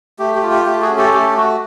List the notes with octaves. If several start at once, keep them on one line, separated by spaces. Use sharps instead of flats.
A3 G4
G4
F4
G4
A3 G4
F#4 G#4
C#4
G4 A4
A3 G4 A4
F#4